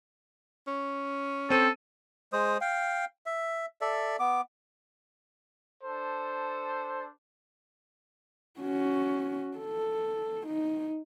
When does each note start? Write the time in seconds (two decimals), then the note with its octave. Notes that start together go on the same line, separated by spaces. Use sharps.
0.67 C#4
1.50 C4 A4 C5 D#7
2.33 G#3 C5 D#6
2.61 F5 G5
3.26 E5
3.81 A4 D5 E5
4.19 B3 D6
5.83 D4 A4 C5
8.61 C#4 F#4
9.58 A4
10.47 D#4